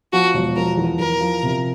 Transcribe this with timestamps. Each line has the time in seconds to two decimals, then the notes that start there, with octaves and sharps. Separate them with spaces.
0.13 F3 F#4
0.34 E1
0.56 F3 A#4
0.77 E2
1.00 E2 A#4
1.21 F3
1.43 C3